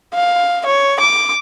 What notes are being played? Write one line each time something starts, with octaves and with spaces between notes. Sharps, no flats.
F5
C#5
D6